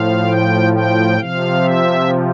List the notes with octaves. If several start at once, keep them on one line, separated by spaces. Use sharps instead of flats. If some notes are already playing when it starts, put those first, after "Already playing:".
Already playing: A2 F3 F5
G5
G5
C3 F3 F5
E5